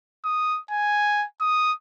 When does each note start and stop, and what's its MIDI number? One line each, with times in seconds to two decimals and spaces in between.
0.25 0.59 87
0.71 1.26 80
1.41 1.73 87